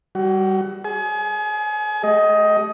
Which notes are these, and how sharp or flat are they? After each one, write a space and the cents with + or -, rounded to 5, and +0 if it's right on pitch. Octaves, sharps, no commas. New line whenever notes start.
G3 -5 F#4 +30
G#4 +5 G#5 +35
A3 -35 G4 +0 D#5 +15